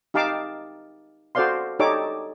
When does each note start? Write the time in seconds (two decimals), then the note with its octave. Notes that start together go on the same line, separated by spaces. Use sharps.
0.14 D#4 G4 F5 A5 D6
1.35 F#4 A4 C5 D5 F5 C6
1.79 D#4 G4 A4 C#5 D5 D6